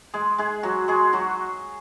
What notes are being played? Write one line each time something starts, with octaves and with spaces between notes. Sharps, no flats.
G#3 G#4
G#3 G#4
F#3 F#4
G#3 G#4
F#3 F#4